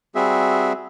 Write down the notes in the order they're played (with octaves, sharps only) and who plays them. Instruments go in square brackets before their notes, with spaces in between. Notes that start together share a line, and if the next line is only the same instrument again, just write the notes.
[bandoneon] G3 C4 F#4 G#4 E5